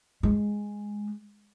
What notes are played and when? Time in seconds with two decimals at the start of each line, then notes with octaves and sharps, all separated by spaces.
0.23 G#3